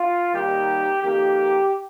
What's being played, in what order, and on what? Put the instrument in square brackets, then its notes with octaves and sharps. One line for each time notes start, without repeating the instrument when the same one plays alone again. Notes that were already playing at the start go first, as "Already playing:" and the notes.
Already playing: [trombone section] F4
D#2 D#3 G3 A#3 G4
F2 D#3 A#3 G4